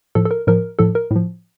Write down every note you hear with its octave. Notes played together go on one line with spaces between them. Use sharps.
A2 F3 A4
A4
A#4
A2 F3 A#4
A2 F3 A4
A#4
A2 F3